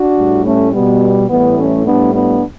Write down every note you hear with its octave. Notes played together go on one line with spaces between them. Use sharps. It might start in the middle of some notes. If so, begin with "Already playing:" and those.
Already playing: D4 F#4
A2 G3
A3 C#4
B2 G3 B3
A2 E3 G3 B3
A3 C#4
A2 G3 B3 D4
B3 D4